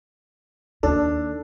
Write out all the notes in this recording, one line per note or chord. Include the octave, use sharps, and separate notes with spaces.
D#2 D4 A4